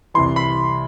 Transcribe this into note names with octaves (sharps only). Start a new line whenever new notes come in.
C2 C3 E3 C6
B5